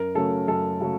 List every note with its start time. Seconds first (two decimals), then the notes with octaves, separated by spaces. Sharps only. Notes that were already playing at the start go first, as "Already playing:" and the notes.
Already playing: F#2 A#4
0.15 C#3 F#3 A3 C#4 A4
0.48 F#2 A4
0.80 C#3 F#3 A3